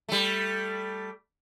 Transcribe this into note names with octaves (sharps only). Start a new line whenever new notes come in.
G3 A3